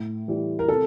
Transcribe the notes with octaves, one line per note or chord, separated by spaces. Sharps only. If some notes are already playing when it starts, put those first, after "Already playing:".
Already playing: A2
E3 G3
A#4
C3 A4